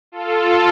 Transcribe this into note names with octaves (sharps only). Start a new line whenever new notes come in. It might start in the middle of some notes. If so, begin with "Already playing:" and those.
F4 A4